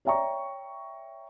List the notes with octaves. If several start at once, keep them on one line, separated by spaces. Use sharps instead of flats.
C#5 D5 E5 G5 A#5 C#6